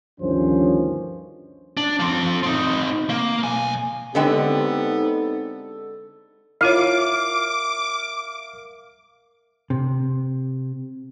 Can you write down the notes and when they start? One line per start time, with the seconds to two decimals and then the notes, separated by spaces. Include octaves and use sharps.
0.20 D2 G2 D#3 F3 C#4 C5
1.77 D4
2.00 F3 C4
2.43 C4 D#4
3.10 A#3
3.43 B1 G#5
4.15 D3 G#3 B3 C4 D#4 G4 A4 G5
6.61 E4 F4 A#4 C#5 E5 F5 D6
9.70 C3